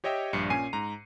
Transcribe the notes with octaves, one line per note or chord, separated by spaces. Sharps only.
G4 C#5 D#5 E5 G5
A#1 G2 C7 C#7
A#2 C#4 G#5 C7 D#7
G#2 A#5